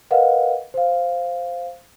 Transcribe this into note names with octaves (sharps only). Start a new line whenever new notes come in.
A#4 B4 D#5 F5 F#5
C5 F5